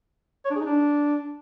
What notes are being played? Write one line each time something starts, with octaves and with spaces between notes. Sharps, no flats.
C#5
D4
G#4
D#4
D4